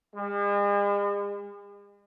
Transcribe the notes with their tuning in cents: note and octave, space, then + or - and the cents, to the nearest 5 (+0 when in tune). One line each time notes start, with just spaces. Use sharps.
G#3 -45